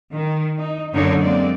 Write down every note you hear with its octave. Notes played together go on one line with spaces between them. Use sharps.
D#3
D#4
F#2 D3 A#3 D#4 A#4 C#5
G#3 A#3 C4 D5